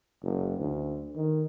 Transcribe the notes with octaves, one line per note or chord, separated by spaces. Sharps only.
F#1
D2
D#3